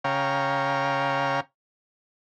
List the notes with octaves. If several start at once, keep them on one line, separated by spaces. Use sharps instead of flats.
C#3 C#5 F5 G5 A#5